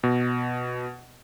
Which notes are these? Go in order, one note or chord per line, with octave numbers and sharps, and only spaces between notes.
B2